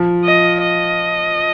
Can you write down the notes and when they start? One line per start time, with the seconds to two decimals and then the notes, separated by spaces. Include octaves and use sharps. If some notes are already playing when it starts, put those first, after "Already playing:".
Already playing: F3
0.25 D#5
0.61 D#5